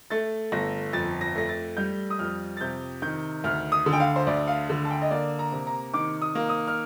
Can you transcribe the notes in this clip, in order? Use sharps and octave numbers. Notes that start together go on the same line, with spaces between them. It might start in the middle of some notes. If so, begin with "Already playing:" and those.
A3 A6
G1 A#6
F2 A6
A#6
A3 A#6
A6
G3 G6
D#6
F2 F6
A6
C3 G6
D#3 G6
D2 F6
D#6
D3
G5
F5
C5
D2 D5
F5
D3
A5
G5
D#5
A#3 D5
A#5
C3
A#5
D#3 D6
D#6
A#3
D#6
F6